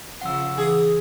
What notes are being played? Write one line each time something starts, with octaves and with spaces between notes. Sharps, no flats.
C#3 F3 F#5 E6
E3 G#4